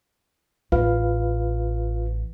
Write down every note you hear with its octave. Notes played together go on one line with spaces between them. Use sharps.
A1 F4 B4 F5